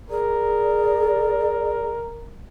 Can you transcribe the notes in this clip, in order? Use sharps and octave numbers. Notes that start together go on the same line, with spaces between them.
G#4 A#4 D5